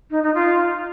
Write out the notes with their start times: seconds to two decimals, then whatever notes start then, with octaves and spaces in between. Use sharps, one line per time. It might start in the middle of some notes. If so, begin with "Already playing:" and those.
0.11 D#4
0.22 D#4
0.34 F4